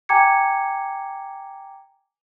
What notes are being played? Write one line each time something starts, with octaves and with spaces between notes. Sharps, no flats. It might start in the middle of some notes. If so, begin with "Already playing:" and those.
G5 G#5 A#5 D6 G#6 C#7